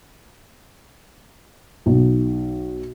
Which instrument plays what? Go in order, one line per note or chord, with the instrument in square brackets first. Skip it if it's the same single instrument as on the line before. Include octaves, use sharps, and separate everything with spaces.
[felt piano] B1